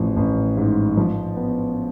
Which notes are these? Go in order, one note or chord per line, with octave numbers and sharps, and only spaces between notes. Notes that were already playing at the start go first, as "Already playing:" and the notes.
Already playing: A1 F3
A1
G#2
F3
B3